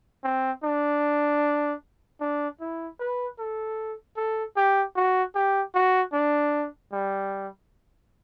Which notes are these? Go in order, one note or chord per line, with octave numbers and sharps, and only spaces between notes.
C4
D4
D4
E4
B4
A4
A4
G4
F#4
G4
F#4
D4
G3